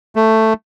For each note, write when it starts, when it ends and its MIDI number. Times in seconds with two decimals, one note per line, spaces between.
0.16 0.53 57